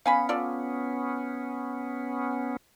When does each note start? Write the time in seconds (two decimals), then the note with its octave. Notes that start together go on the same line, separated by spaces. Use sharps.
0.06 B3 C#4 F5 G#5 B5
0.29 F4 A4 D5